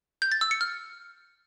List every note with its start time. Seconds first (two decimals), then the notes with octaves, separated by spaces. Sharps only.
0.22 G6
0.32 A6
0.41 E6
0.51 C#7
0.61 F6